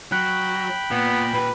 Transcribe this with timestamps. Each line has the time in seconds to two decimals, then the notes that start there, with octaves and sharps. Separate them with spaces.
0.12 F#3 G5 B5 F#6
0.91 A#2 B3
1.34 A#2 G4 B4